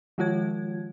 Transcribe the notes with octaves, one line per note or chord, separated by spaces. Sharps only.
D#3 F3 G#3 F4 C#5 G#6